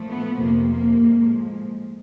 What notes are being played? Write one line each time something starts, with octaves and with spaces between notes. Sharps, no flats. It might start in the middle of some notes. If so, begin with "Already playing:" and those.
Already playing: A#2 F3 A3
B3
F2 C3 F3 A#3
A#3
A2 F3 G#3